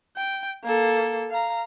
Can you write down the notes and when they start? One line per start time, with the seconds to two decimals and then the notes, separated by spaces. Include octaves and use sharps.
0.16 G5
0.64 A#3 A4
1.30 F5 A#5